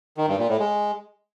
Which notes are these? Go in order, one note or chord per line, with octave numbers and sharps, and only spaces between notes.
D#3
G2
A#2
A2
G#3